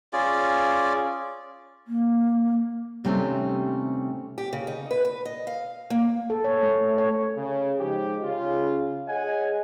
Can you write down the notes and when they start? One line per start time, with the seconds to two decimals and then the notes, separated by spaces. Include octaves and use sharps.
0.13 C#4 F4 G#4 D5
1.87 A#3
3.04 D#2 C3 G3 A3 C4 C#4
4.38 G4
4.53 C#3
4.67 D#4
4.91 B4
5.05 B4
5.25 D#5
5.47 F5
5.90 A#3
6.30 A4
6.44 C#5
6.63 A3
6.98 C#5
7.37 C#3
7.79 F3 G#3 D#4 G4
8.23 C#3 F4
9.08 G#4 C#5 D#5 F#5 G#5